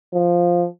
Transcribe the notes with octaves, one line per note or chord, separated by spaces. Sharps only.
F3